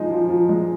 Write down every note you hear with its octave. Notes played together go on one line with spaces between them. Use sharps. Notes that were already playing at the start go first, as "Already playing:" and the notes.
Already playing: F3 G#3 D#4
F3
F3
G#3